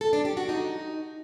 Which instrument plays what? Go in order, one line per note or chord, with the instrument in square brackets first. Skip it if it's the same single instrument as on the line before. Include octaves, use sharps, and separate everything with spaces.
[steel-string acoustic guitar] A4
D4
G4
F#4
D#4